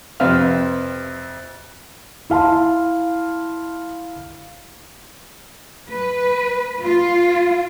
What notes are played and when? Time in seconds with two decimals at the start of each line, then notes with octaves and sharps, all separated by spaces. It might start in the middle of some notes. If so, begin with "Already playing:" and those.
0.20 F2 C3 C4 B4 E5 F6
2.30 E4 F5 A5 C6
5.90 B4
6.83 F4